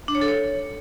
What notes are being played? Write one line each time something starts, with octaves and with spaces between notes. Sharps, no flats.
D4
C#5
A4
C#5